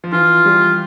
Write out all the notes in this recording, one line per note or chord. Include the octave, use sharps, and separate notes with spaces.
F3
E3 F4
G3